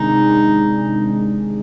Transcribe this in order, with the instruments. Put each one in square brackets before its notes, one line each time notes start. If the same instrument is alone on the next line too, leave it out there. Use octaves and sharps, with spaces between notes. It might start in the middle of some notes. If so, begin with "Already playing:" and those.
Already playing: [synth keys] C3 D#3 G#3 D4 G#4 [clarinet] D#4